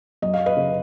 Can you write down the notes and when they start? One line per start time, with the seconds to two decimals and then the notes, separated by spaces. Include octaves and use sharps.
0.22 F#2 D#5
0.34 F5
0.46 B4 D#5
0.57 C#3